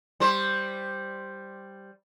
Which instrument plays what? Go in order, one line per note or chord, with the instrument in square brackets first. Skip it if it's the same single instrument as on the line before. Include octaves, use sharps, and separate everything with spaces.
[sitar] G3 C5